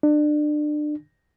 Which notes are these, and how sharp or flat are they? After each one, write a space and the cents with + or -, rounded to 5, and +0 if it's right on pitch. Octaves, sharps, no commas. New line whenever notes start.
D4 +30